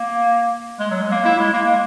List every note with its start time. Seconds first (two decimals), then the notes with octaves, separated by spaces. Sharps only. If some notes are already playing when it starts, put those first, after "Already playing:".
Already playing: A#3
0.80 G#3
0.91 F#3
1.01 G#3
1.12 A#3
1.25 E4
1.40 G#3
1.53 A#3
1.67 G#3